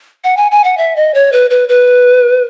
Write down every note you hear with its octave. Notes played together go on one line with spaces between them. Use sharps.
F#5
G#5
G#5
F#5
E5
D#5
C#5
B4
B4
B4